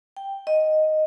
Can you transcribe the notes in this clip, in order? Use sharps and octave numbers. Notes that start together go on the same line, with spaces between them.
G5
D#5